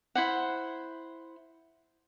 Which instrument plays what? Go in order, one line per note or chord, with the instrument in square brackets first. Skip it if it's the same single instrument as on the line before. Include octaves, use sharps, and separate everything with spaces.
[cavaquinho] E4 C5 F#5